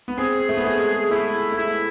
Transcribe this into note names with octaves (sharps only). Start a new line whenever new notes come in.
B3
C4 G#4
A3
B3
A3 G#4
G#3
A3 E4
A3
G#3 E4